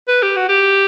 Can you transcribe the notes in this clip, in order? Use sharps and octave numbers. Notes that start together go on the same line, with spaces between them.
B4
G4
F#4
G4